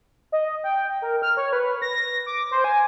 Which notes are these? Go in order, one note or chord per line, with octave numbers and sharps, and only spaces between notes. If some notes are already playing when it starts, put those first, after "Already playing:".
D#5
G5
A#4
F6
C#5
B4
A#6
D6
C5
G#5